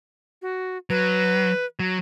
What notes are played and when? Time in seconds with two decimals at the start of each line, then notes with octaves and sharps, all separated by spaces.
0.42 F#4
0.90 F#3 B4
1.79 F#3